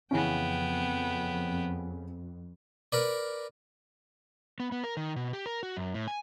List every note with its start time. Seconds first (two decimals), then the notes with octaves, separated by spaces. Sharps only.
0.11 F2 C#3 E3 B3 C#4 G5
2.92 A#4 B4 D5
4.60 B3
4.72 B3
4.84 A#4
4.97 D#3
5.16 B2
5.33 G4
5.46 A#4
5.63 F#4
5.77 F#2
5.94 A2
6.08 G#5